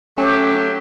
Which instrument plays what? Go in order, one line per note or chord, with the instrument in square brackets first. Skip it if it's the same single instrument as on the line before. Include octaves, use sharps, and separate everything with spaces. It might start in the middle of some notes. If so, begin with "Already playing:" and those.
[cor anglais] F#3 [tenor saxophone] A3 [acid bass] C#4 [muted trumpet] G4